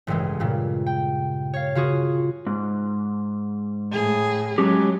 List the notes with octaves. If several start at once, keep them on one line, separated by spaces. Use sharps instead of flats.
A1 G2 C#3 E3 G#3
G2 A#2 C#3
G5
C#5 F5
C#3 F4 F#4 G#4
G#2
A2 G#4
F#3 G#3 C#4 G4